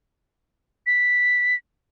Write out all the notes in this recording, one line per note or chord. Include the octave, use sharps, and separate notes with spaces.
B6